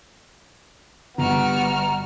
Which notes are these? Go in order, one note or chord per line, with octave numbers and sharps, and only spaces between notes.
G1 G3 B3 F#4 A#5 F6